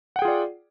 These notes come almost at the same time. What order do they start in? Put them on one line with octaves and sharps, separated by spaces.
F#5 G5 G#4 F4 D5